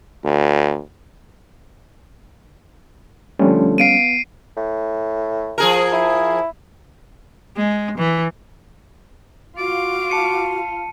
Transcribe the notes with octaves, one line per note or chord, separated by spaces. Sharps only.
D2
D3 F3 G3 A3 C#4
B3 F5 C7 D7 D#7
A2
F3 G#4 A#4
E4
G#3
E3
F4 F#4 F5 D6
A5 C#7 D#7